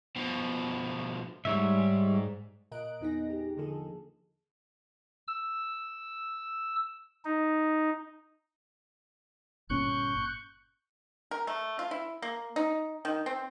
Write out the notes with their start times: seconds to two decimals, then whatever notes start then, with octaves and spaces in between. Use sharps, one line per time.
0.16 B2 F3
1.45 B1 G#2 G3 C#5 E5
2.71 A#2 A#4 D#5 F#6 D7
3.00 E2 B3 D#4 G#4 A#6
3.30 G4
3.57 D3 F3 A#3 G#4 A4
5.28 E6
7.25 D#4
9.70 G1 A#2 C#4 C#6 F#6 G6
11.31 A#4
11.47 A3
11.79 F4
11.91 E4
12.22 A#3
12.56 D#4
13.05 D#3
13.26 C4